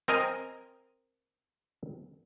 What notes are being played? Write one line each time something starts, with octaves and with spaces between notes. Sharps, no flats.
C4 A#4 D#5 G#5 A#5